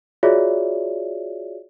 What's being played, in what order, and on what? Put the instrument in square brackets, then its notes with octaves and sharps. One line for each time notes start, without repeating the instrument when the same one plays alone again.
[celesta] F4 F#4 G#4 C#5 D5 E5